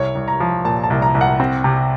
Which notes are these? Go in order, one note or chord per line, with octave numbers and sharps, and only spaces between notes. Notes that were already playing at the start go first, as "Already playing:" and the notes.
Already playing: C2 C#5
C2
A#5
F3
A#2 A5
A5
C2
A#5
C2
F#5
C4
C3